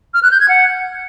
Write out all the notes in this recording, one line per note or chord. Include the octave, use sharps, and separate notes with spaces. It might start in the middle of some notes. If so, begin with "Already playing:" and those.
F6
F#6
G6
G#6
F#5